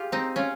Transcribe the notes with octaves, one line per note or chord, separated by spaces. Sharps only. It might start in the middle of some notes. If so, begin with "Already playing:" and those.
Already playing: F4 G4 G#4
C4 D#4
C#4 F4